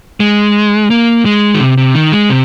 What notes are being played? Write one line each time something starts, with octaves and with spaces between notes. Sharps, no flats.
G#3
A#3
G#3
D#3
C3
C3
D#3
G#3
C3